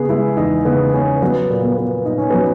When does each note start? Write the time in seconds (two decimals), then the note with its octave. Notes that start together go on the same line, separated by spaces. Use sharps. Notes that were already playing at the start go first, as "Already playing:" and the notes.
Already playing: C#3 B3 G#4
0.09 G#3 E4
0.37 E2 D#4
0.65 C#3 B3
0.94 B3 C#4
1.22 F#3 B3
1.50 A#2
1.63 B3
1.78 B3
2.05 A#2 D#4
2.18 C#4
2.30 F#3 B3